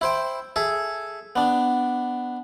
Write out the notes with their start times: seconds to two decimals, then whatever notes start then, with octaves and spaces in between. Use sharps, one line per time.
0.01 E4 C5 G5
0.56 G#4 A4 E5
1.36 B3 D4